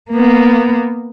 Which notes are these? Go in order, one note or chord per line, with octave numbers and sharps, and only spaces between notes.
A#3 B3